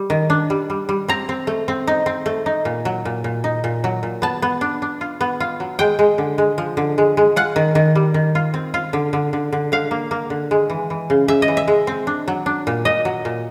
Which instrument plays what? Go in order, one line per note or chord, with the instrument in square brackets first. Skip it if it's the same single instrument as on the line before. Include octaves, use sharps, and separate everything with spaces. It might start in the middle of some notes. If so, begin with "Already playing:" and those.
Already playing: [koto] G3
D#3
D4
G3
G3
G3
C4 A#5
C4
A3
C4
D#4
C4
A3
D#4
A#2
F#3
A#2
A#2
D#4
A#2
F#3
A#2
B3 A5
B3
D4
D4
F4
B3
F4
F#3
G#3 G5
G#3
D3
G#3
F3
D3
G#3
G#3
F4 F#5
D#3
D#3
G3
D#3
F4
C4
F4
D3
D3
D3
D3
D3 F5
A#3
A#3
D3
G#3
E3
E3
C#3
C#3 E5
D#5
E3
E5
G#3
C4
D4
F#3
D4
A#2
A#2 D#5
F#3
A#2